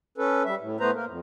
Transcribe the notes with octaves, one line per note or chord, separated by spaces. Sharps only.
C#4 A4 B4
G3 E5
A2
A2 A3 B3 B4 C5 A#5
A#3 A#4
F2